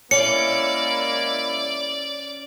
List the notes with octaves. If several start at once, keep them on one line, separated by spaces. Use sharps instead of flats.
G#3 A#3 C#4 E4 D5 C#7